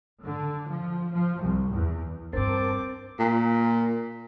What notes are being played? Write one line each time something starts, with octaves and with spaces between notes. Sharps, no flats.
D3
F3
F3
C2
E2
G2 C4 D4 A#4 C5 A5 D6
A#2